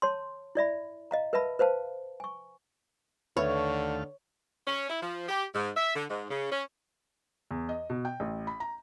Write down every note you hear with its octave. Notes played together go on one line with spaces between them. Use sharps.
C#5 A5 C6
E4 D5 E5 B5
D#5 F5 A#5
A#4 B4 D#5 E5 A5 B5
B4 C5 F5 A5
G#5 C#6
D#2 D3 A3 B4 C#5 E5 F5
C#4
E4
F3
G4
G#2
E5
D3
G#2
C#3
C#4
E2
D#5
B2
G5
A1
B5
A#5